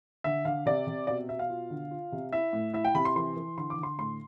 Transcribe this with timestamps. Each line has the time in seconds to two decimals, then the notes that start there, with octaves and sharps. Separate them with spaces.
0.24 D3 E5
0.45 D3 F5
0.66 C3 D5
0.87 C3
1.07 B2 D5
1.28 B2 E5
1.39 F5
1.50 F4
1.70 D3
1.91 F4
2.12 C3
2.33 E4 E5
2.53 A2
2.73 E4 E5
2.85 G5
2.94 C3 B5
3.05 C6
3.16 E3 C6
3.37 E3
3.57 D3 C6
3.70 D6
3.78 D3
3.83 C6
3.98 A2 C6